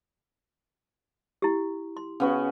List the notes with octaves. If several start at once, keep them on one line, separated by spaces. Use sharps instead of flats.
E4 G4
C6
C#3 B3 F#4